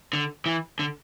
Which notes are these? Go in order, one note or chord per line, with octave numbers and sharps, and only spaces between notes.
D3
E3
D3